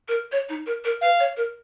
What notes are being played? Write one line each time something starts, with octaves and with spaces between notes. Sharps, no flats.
A#4
C#5
D#4
A#4
A#4
B4 F5
C#5
A#4